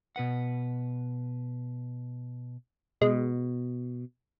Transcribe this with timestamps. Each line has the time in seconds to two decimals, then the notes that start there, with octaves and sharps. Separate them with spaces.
0.16 B2 B4 F#5
3.02 B2 G#3